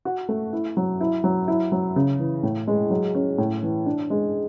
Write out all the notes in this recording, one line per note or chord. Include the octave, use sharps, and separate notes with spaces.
F#4
A3
E4
F#3
E4
F#3
E4
F#3
C#3
E3
A2
G#3
F#3
C#4
A2
E3
D4
G#3